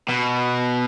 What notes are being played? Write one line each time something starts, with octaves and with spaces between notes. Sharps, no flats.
B2